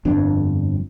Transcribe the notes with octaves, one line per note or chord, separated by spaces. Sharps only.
G1 F2 D4